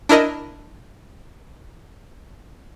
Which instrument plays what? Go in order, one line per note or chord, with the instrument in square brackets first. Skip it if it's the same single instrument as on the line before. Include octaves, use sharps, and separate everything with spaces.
[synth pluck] D4 E4 A#4 D#5